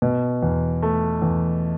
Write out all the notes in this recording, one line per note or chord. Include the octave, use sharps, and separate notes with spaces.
B2
E2
A3
E2